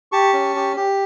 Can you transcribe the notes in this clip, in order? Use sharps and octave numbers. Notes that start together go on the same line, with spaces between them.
G4 A5 C#6
C#4
G4
G4